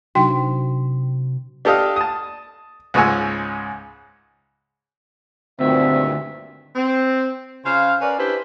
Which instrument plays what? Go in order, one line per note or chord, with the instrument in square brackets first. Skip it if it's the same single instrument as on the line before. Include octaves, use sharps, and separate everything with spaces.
[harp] C3 [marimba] F#3 D4 D#4 [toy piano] F#4 [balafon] G5
[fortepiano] D4 G4 A4 D#5 F5
A5 D#6
C#2 G#2 G#3 C#5 G#5 E6
[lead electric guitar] D2 [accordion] G2 A#2 D#3 [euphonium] C4 [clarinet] E5
[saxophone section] C4
C#3 C5 F5
C#4 A#4 B4 D5
D4 E4 G4 B4 C5